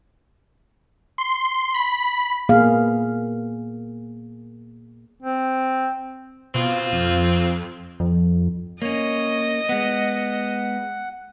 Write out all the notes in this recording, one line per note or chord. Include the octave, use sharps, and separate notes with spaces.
C6
B5
A#2 A#3 B3 G#4 F5
C4
B2 C4 F4
F2
F2
A#3 C#4 C#5 D#5
G#3 B3 F#5